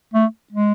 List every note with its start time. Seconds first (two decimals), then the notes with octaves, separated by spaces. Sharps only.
0.14 A3
0.52 G#3